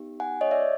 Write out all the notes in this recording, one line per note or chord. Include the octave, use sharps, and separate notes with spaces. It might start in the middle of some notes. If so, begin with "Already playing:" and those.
Already playing: B3 D#4 G4
F#5 G#5
C#5 D#5
D5 E5